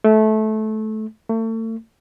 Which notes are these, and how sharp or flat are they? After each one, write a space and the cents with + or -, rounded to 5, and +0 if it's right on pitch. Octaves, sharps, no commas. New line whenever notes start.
A3 -20
A3 +35